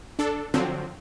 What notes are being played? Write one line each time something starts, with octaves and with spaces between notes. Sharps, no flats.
D4 A4
D3 F3 F#3 C4